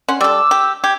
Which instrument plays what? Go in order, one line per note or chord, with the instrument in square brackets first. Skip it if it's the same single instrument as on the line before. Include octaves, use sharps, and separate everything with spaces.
[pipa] C#4 F#5 [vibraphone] C6
[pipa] G3 A4 [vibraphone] D6 [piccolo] E6
[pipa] G4
[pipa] G4 [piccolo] G#6